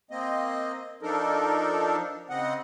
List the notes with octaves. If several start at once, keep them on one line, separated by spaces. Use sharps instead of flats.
A#3 C4 D#5
F3 D4 D#4 A4 A#4
C#3 C4 D#5 F#5